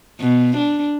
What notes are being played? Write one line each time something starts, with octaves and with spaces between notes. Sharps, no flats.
B2
D4